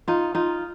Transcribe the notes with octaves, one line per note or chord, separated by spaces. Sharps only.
D#4 F4
D#4 F4